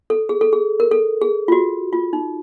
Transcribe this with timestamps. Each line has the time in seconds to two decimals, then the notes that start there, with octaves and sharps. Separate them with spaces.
0.10 A4
0.29 G#4
0.41 A4
0.53 G#4
0.80 A#4
0.91 A4
1.22 G#4
1.48 F4
1.52 F#4
1.93 F4
2.13 D#4